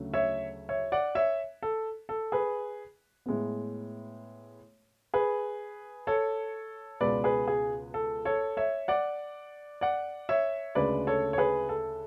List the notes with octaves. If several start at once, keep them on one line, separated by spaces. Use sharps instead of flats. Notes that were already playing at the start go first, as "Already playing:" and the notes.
Already playing: D2 C#3 F#3 A3
C#5 E5
C#5 E5
D5 F#5
C#5 E5
A4
A4
G#4 B4
A2 G#3 B3
G#4 B4
A4 C#5
C#2 B2 G#3 B3 B4 D5
G#4 B4
G#4
A4
A4 C#5
C#5 E5
D5 F#5
D5 F#5
C#5 E5
D2 C#3 G#3 B4 D5
A4 C#5
C#5
G#4 B4
A4